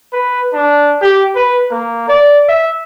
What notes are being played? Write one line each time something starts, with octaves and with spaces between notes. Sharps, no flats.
B4
D4
G4
B4
A#3
D5
E5